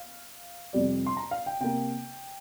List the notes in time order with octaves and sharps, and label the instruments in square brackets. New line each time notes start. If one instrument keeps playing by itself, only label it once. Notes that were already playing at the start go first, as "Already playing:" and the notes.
Already playing: [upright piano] F5
F2 C3 G3 D5
C6
A#5
F5
G5
C3 A#3 G5